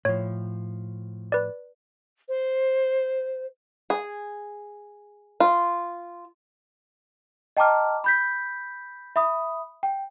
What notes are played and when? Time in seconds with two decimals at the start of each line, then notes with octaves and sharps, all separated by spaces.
0.05 A2 F3 C#5
1.32 B4 D5
2.28 C5
3.90 G#4
5.40 F4
7.57 D#5 G5 A5 A#5 D6 F6
8.04 B5 G6 B6
9.16 E5 B5 D#6
9.83 G5